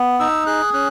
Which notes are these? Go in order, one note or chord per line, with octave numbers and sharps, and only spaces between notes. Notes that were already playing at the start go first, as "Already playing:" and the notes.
Already playing: B3
D#4 E6
G#4 F#6
C#4 F#6